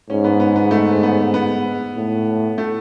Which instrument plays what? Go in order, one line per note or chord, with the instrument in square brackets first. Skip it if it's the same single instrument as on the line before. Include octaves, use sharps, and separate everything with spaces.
[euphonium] G#2 [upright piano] C#4
[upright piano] B3
B3
B3
A3
B3
B3
[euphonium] A2
[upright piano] A3